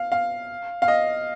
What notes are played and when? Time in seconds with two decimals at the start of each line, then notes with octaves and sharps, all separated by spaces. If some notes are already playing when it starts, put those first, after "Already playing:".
Already playing: F5
0.12 F5
0.82 F5
0.88 D#5